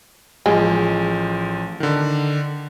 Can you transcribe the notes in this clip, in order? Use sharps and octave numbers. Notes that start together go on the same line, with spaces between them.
A1 F3 G#3
D3 D#3